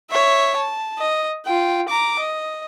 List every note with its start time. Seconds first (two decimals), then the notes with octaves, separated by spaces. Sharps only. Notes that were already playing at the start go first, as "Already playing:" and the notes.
0.11 C#5 E5
0.56 A5
0.99 D#5
1.46 F4 G5
1.88 A#5 D6
2.19 D#5